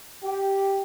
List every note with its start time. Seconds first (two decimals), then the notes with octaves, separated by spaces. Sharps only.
0.23 G4